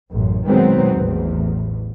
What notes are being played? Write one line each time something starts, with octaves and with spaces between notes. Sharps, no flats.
A1 F#2
B2 D#3 F#3 G#3 B3 C4
A1 E2